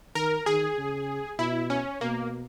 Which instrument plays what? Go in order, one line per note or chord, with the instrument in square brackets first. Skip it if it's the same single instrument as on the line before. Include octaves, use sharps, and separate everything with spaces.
[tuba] D#3 [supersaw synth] A#4
[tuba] D#3 [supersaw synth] G#4
[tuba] C#3
[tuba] B2 [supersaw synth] E4
[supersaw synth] C#4
[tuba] B2 [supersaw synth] A#3